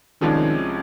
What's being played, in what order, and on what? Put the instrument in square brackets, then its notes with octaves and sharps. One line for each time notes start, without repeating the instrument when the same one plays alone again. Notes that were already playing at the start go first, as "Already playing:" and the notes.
[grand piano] C2 C3 F3 G#3 C#4 [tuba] D#3